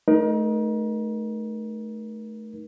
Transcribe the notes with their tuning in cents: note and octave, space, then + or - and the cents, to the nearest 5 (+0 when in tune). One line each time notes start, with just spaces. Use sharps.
A3 -15 D#4 +0 A#4 +35